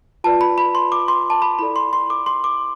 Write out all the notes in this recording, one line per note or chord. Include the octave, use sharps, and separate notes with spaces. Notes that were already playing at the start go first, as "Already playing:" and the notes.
F4 B4 D5 A5
B5
B5
C6
D6
C6
A5
B5
E4 A4 D5 B5
C6
C6
D6
C6
D6